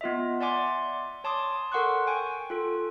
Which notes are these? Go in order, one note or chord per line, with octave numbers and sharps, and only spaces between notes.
B3 F4 D#5 E5
D5 E5 F#5 G#5 C6 D6
C#5 A5 C6 D6 D#6
A4 A#4 F#5 C6 C#6 F#6
G5 G#5 C#6
F4 A4